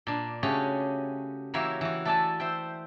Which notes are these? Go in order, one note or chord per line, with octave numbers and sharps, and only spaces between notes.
A#2 D4
C#3 A3 C#4 F#4 G4 C#5
E3 F#3 A#3 G4 C#5 E5
E3 F#4
A3 A4 D5 E5 G#5 A5
C5 E5 G5